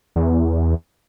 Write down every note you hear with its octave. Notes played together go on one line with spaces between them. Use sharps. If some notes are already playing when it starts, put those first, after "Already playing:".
E2